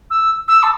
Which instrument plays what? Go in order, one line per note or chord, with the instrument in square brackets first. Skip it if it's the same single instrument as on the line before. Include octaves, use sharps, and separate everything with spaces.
[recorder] E6
E6
A5